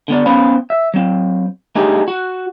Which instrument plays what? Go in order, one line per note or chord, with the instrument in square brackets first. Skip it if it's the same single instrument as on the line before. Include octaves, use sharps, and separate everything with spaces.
[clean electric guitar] D3 B3 D5
B3 C#4 C5 F5 B5
E5
F#3 C4
A3 D4 D#4 G4 G#4
F#4